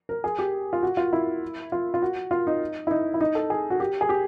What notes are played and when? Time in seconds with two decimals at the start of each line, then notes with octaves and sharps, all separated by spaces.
0.09 A#4
0.24 G#4
0.39 G4
0.73 F4
0.83 F#4
0.97 F4
1.13 E4
1.72 F4
1.94 F4
2.02 F#4
2.31 F4
2.47 D#4
2.87 E4
2.91 D#4
3.14 E4
3.21 D#4
3.35 A4
3.50 G#4
3.70 F#4
3.80 G4
4.01 G#4
4.09 G4